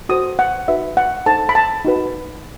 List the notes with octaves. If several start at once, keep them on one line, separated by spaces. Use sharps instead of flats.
F#4 A4 C5 D#6
F#5
D#4 F#4 B4 E5
F#5
D#4 A4 C5 A5
B5
A5
D#4 F#4 B4